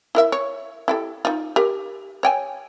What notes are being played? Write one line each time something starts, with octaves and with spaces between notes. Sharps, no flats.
E4 A#4 E5
C#5
E4 G4 A4
D#4 F4
G4 A#4
C#5 G5 G#5